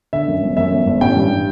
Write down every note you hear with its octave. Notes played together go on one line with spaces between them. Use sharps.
D3 E5
F#2
G1
F#2 E5
G1
G1
A1 G5
G2